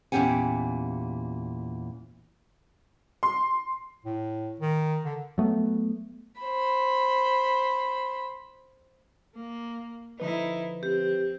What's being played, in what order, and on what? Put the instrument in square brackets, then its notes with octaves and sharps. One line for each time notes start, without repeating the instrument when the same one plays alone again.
[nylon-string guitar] E2 A#2 C#4 G4 F#5 G#5
[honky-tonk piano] C6
[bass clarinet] A2
D#3
D3
[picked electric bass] F#3 A3 B3
[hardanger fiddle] C5 B5
[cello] A#3
[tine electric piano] D3 F3 B4 [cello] D#4 E4
[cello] C4 [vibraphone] G4